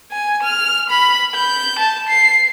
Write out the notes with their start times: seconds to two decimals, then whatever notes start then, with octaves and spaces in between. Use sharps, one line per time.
0.12 G#5
0.43 F6
0.90 B5
1.35 G6
1.79 A5
2.09 C7